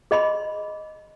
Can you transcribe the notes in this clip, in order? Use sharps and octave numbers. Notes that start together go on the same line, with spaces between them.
G#4 D#5 B5 C6